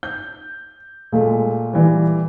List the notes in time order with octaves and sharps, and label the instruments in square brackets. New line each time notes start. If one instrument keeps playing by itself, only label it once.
[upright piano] G6
[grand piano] A#2 A3 [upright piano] G#3
[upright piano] E3 G3